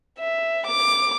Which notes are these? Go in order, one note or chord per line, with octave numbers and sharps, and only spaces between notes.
E5
D6